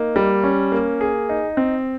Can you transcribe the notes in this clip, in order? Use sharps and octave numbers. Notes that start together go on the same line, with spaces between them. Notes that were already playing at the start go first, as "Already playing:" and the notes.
Already playing: A#3 D#4
G3
C#4
A#3
G#4
D#4
C4